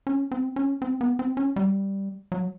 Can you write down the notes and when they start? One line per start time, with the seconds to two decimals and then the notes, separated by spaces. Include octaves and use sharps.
0.07 C#4
0.32 C4
0.56 C#4
0.82 C4
1.01 B3
1.19 C4
1.37 C#4
1.56 G3
2.32 F#3